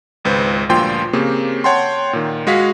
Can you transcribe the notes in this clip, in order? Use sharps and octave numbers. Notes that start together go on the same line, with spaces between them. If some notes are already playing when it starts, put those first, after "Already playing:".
G#1 C#2 B4 C5
D2 G2 A#2 F3 G5 C6
C#3 A#3 C4 G4
C#5 F#5 G5 A5 C6
A#2 D#3
G#3 F#4 G#4 F5 B6